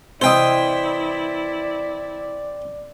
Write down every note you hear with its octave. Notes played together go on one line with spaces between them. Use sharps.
C3 E3 E4 C5 D5 D#5 G5